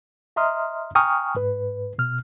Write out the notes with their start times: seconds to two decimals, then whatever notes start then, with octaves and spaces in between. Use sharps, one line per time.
0.36 D#5 E5 A#5 C6 D#6 F6
0.95 G5 G#5 A#5 C#6 D#6 F6
1.35 G#2 B4
1.98 B2 F6